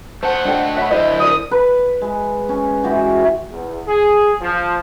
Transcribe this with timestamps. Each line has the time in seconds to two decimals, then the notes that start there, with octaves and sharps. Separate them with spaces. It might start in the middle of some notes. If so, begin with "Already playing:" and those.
0.23 A3 C5 F#5 A5 C#7
0.45 D4 A4 D#5 G5
0.77 C#5 E5 B5
0.91 D3 E4 C5 D#5
1.20 A#4 D5 E5 D#6
1.51 B4
2.01 G#3
2.49 C#4
2.83 E3 G#3 F#4 G4
3.51 E2
3.88 G#4
4.41 F3